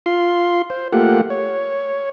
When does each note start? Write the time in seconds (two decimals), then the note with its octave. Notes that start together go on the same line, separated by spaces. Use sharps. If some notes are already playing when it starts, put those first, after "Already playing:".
0.06 F4 C6
0.70 C5
0.93 A3 A#3 F4 G4 F#5
1.30 C#5